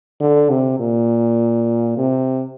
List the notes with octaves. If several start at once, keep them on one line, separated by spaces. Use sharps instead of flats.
D3
C3
A#2
C3